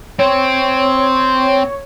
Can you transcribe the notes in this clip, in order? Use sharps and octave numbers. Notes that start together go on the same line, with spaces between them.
C4 C#5